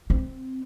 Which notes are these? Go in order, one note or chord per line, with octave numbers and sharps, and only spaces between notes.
C4